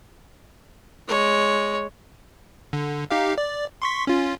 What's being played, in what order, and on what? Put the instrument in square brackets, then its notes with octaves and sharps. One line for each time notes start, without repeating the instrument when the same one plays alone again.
[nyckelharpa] G#3 C#5
[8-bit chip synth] D3
D#4 G4 F5
D5
C6 C#6 B6
C#4 F4